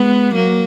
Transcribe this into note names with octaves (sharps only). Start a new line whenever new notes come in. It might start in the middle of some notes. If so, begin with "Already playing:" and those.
Already playing: G#3 B3
F#3 A#3